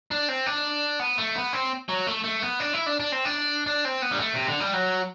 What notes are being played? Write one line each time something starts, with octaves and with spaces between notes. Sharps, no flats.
D4
C4
D4
B3
A3
B3
C4
F#3
A3
A3
B3
D4
E4
D4
D4
C4
D4
D4
C4
B3
G3
A3
C3
D3
G3
F#3